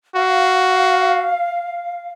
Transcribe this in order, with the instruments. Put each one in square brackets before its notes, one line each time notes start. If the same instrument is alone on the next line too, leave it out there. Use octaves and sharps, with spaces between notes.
[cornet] F#4 [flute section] F5